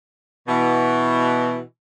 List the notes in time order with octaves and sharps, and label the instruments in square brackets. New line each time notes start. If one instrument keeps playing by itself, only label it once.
[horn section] B2 E3